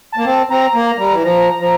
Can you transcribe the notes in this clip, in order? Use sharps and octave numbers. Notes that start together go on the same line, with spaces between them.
A#3 A5
C4
C4 A#5
A#3
A#5
G3
E3
F3 A#5
F3